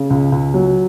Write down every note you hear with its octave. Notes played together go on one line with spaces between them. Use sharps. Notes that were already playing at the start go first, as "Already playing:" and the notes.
Already playing: C#3
C#2
C#2
F#3